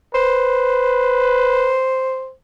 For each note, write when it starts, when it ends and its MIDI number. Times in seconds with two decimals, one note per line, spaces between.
0.14 1.79 71
0.14 2.31 72